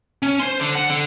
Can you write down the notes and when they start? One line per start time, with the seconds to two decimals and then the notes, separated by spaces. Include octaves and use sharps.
0.22 C#4
0.40 C5 C6
0.59 D3
0.75 F#5
0.90 D3